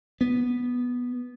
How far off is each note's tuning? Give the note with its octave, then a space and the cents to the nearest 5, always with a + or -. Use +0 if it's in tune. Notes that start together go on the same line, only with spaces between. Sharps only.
B3 -5